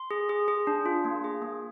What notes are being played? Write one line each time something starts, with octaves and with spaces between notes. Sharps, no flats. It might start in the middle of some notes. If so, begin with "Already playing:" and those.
Already playing: C6
G#4
G#4
G#4
D4
F4
A#3
G#4
A#3